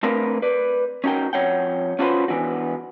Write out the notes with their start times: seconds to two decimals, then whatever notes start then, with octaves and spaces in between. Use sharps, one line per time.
0.03 A3 C4 D4 A#4 B4 F5
0.42 B4 D5
1.04 C#4 D#4 F#4 A#4 G5
1.33 F2 G#3 C#5 F#5 G5
1.99 C#4 F4 F#4 G#4 B4 C5
2.28 E3 B3 D4 F#4